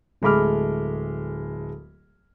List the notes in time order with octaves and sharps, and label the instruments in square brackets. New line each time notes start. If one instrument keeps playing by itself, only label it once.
[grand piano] D1 G#3 A3 B5 D6 F6